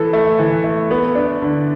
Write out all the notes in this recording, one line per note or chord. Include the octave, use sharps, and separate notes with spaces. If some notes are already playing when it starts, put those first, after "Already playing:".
Already playing: E3 A4
A3
E3
A3
B3
D4
D3